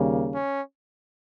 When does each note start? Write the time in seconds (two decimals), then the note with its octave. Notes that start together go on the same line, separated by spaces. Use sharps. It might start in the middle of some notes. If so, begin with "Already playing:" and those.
Already playing: D#2 C#3 G3 A#3
0.32 C#4